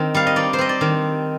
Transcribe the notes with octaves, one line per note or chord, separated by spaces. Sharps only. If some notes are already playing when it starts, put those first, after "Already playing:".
Already playing: D#3 C4
G3 F5
D#5
D#4 D5
C5
C4 D#5
D5
D#3